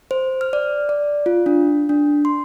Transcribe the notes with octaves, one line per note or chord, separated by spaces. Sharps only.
C5
F6
D5
D5
F4
D4
D4
C6